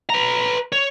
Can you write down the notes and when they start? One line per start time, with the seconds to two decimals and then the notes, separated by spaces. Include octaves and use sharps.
0.10 B4 A#5
0.73 C#5